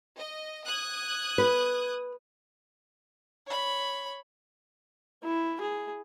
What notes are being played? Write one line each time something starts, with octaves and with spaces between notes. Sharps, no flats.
D#5
D#6 F#6 G#6
B4
C#5 B5
E4
G#4